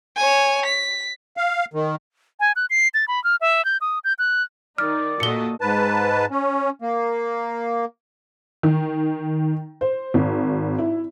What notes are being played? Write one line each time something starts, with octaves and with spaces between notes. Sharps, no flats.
C#5 G#5
B6
F5
D#3
G#5
F#6
C7
A6
B5
F6
E5
G6
D#6
G6
F#6
D#3 D#4 D5 F6
A#2 F#4 A4 D#5 C#7 G7
G#2 B4 A5
C#4
A#3
D#3
C5
G#1
E4